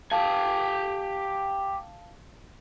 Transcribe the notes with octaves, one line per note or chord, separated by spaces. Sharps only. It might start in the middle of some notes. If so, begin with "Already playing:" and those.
G4 F5 G#5 A5